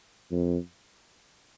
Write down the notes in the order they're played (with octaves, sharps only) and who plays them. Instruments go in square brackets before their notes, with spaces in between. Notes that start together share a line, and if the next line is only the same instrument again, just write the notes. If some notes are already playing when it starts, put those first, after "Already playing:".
[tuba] F2